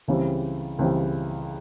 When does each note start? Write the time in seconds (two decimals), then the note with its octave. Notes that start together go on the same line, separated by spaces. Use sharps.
0.08 C#2 C#3 E3 G3 C4
0.79 C#2 C#3 E3 G3 C4